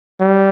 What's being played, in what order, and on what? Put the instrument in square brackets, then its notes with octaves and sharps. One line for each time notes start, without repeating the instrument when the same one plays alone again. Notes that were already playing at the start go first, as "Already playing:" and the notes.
[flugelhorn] G3